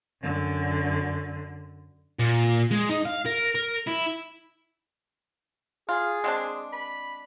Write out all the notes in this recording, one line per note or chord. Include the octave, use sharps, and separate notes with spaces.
F#2 D3
A#2
G#3
D#4
F5
A#4
A#4
E4
F4 G#4
G#3 C4 D4
B5